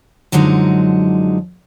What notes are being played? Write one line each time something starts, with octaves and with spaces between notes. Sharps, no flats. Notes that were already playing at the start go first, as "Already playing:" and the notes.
F#2 D3 F3 F#3 G#3 D#4